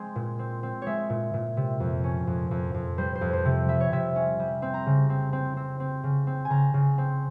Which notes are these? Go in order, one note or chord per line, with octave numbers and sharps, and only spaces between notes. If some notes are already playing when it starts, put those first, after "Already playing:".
Already playing: G#3 C4
A#2
C4
C4
G#3 C#5 E5
A#2
A#2
C3
F2
C#4
F2
F2
F2
G3 C5
C5
F2
C5
C3
G3 E5
C#5
C3 E5
C#4
G3
C4
A#5
C#3
C4
C4
C4
C4
C#3
C4
G#5
C#3 A#5
C#3
C4